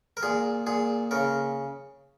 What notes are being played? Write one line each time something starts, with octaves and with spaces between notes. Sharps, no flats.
A#4
A#2 G#4
A#2 G#4
C#3 A#4